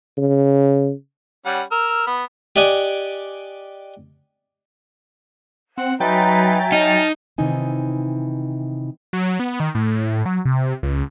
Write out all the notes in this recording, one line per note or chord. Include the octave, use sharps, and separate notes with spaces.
C#3
G3 C#4 F#5
A#4 E6 F6
B3 B5
G4 D5 D#5 F#5 G#5
C4 F#5
F#3 D#4 B4 E5 G5 G#5 A#5 A6
D#4 A5 F6
C3 D#3 E3 D#4 G#5
F#3
B3
D#3
A2
F#3
C3
C#2